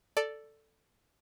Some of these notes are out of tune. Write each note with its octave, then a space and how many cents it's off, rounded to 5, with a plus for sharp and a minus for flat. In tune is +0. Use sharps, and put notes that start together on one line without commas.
A4 +5 D5 +0